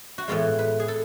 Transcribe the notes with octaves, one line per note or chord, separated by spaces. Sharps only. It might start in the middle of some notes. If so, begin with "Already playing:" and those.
F#4
A2 E3 G#3 B3 E4 F4
B4
G#4
A4